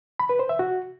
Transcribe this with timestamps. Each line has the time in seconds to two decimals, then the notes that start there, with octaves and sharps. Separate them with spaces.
0.20 B5
0.29 B4
0.39 C5
0.49 E5
0.59 F#4